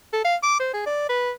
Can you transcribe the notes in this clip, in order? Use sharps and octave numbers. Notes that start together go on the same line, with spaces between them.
A4
F5
D6
C5
G#4
D5
B4